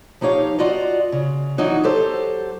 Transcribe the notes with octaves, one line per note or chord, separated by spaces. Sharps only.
F3 D#4 G4 C#5 F5
F4 F#4 D5 D#5
C#3
D2 E3 F#3 D#4 F#4
F#3 G4 A4 C5